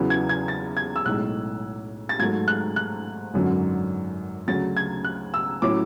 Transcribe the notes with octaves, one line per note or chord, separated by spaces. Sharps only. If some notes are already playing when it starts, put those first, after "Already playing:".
Already playing: E2 C#3 F#3 B3 E4
G#6
G#6
A6
G#6
E6
B1 A2 G#3 F#6
A6
G#2 F#3 A3 G#6
F#6
F#6
G#1 F#2 D3 F#3
D2 C#3 F#3 A6
G#6
F#6
E6
A2 F#3 C#4 E4 D6